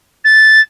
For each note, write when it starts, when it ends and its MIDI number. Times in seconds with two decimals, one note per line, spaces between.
0.24 0.60 93